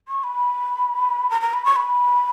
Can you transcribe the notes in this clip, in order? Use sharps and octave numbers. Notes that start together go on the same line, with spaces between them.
C#6
B5
A#5
A#5
B5
C#6
B5